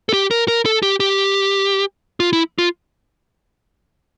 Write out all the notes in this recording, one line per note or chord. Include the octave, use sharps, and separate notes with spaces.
A4
G4
A#4
A#4
A4
G4
G4
F4
E4
F4